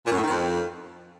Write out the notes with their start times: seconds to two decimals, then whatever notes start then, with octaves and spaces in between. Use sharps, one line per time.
0.06 A#2
0.12 F#2
0.18 A2
0.24 D#3
0.29 F2